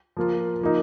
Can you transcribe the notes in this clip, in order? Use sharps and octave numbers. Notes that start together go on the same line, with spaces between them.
F3 A#3 F4
F3 A#3 D#4